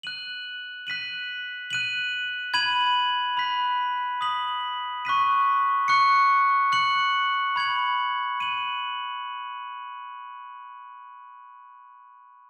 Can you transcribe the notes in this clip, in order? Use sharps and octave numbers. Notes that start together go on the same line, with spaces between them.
F#6 D#7 F#7
F#6 B6 D#7 F#7
F#6 D#7 F#7
B5 G#6 D#7 F#7
B5 F#6 B6
D#6 B6 F#7
C#6 F#6 B6 D#7
C#6 F#6 C#7
F#6 C#7 F#7
B5 G#6 C#7 F#7
F#6 D#7 F#7